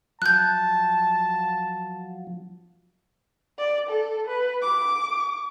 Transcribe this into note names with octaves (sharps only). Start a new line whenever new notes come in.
F3 F#3 A5 F#6 G6
D5
A4
B4
D6